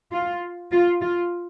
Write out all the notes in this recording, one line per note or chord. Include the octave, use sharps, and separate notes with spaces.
F4
F4
F4